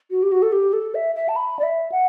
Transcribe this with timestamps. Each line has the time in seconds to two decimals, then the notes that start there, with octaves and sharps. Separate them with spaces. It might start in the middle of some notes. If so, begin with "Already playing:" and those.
0.11 F#4
0.23 G4
0.32 F#4
0.42 A4
0.52 G4
0.73 A4
0.95 E5
1.15 E5
1.29 A5
1.36 B5
1.59 D5
1.63 E5
1.92 F#5